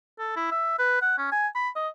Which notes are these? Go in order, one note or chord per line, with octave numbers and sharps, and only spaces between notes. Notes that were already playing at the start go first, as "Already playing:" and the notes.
A4
E4
E5
B4
F#5
C#4
G#5
B5
D#5